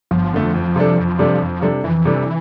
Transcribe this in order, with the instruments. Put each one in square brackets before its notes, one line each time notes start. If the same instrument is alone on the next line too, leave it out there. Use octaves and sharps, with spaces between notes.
[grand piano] G1 [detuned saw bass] F3
[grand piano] F2 D3 A3
F2
C3 G3 D4 A4
F2
C3 G3 D4 A4
F2
C3 G3 D4 A4
[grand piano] F2 [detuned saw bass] E3
[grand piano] C3 G3 D4 A4